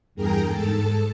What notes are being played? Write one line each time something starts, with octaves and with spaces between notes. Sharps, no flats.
E2 G2 G#4 A#4 G5 A#5
G#2 A4 A5